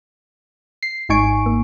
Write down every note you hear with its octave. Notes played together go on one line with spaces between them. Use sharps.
C7
G#1 G#2 D#4 G#5 C#6 D7
G#1 A#3